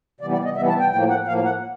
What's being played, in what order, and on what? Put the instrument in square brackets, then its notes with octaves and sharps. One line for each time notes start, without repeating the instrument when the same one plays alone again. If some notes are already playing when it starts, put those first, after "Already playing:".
[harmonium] C3 E3 G3 B3 D5
D5
D#5
C3 E3 G3 B3 E5
A5
G5
A2 F3 A#3 G5
F#5
A2 F3 A#3 F5
F#5